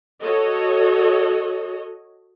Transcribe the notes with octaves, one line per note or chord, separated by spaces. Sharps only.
F#4 A4 C#5 D#5